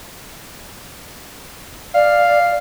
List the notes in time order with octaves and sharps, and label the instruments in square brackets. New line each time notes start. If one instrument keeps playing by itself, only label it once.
[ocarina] D5 [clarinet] F5